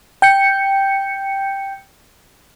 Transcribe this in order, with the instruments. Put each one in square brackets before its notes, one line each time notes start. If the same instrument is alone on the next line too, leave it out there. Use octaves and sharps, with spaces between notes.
[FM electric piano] G5 G6 C#7